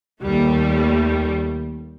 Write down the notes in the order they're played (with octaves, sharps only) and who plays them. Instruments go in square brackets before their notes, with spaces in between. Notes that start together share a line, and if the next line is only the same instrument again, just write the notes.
[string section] D#2 G3 A3